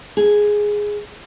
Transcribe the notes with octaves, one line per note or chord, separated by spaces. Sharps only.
G#4